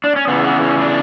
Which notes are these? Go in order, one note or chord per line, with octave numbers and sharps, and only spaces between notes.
D4
C#4
E2 C#3 E3 B3
B3
C#4
D4